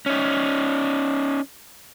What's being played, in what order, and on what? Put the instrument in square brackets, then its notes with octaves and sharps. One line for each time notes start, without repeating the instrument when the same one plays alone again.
[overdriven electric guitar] C#4 D#4